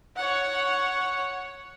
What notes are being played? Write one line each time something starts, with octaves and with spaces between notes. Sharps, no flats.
C#5 F#5